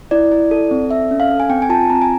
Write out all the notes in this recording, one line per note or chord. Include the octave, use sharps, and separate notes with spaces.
E4 D5
E4
A4
C4
A4 E5
C#4
F5
A4
G#5
C4 G5
G#5
F4 A5
C4 A#5
G#5